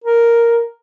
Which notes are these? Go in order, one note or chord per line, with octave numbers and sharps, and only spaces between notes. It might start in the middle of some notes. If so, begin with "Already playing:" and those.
A#4